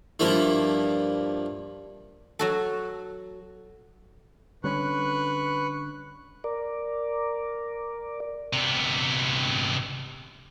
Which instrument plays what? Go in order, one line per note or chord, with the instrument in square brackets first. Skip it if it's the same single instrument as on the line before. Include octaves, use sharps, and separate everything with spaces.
[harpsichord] G2 F3 A#3 E4
[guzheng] F#3 F#4 A4
[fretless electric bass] D3 G3 C#4 [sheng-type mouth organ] B4 C#6 F#6
[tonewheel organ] A#4 D5
[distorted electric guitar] C3 B3